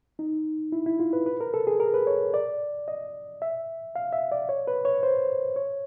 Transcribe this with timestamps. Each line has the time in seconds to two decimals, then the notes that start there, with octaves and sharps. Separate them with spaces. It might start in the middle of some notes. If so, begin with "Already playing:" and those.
0.19 D#4
0.72 E4
0.86 E4
1.00 F4
1.13 B4
1.26 B4
1.41 A#4
1.54 A4
1.67 G#4
1.80 A#4
1.94 B4
2.07 C#5
2.34 D5
2.88 D#5
3.42 E5
3.96 F5
4.13 E5
4.32 D5
4.49 C#5
4.67 B4
4.85 C#5
5.03 C5
5.56 C#5